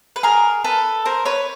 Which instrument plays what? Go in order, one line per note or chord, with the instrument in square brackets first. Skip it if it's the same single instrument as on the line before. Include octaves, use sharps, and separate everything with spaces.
[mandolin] B4
G#4 A#4
A4 B4
A#4 C5
B4 C#5